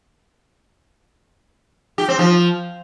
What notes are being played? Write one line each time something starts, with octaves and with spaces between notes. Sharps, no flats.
G4
C4
F3